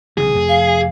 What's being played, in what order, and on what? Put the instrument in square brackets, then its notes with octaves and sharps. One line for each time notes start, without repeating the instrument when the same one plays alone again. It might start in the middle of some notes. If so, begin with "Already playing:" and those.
[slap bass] B1 C#3 E3 [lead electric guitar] G#4
[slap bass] F1 F2 A3
[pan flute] F5